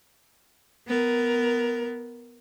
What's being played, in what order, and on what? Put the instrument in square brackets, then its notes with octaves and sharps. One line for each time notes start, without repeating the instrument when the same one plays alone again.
[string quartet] B3 A#4